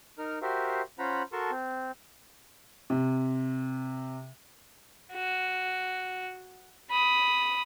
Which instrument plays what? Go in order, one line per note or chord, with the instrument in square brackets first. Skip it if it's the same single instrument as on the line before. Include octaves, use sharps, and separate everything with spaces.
[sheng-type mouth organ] D#4 A#4 F6
F#4 G4 A#4 C5 E5 F5
C#4 F4 C5 F#5 A#5 B5
F#4 A4 A#4 A5 C6 C#6
C4
[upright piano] C3
[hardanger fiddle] F#4
B5 D#6